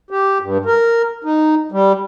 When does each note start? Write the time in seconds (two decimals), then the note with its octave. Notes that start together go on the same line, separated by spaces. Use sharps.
0.11 G4
0.41 G2
0.65 A#4
1.24 D#4
1.72 G3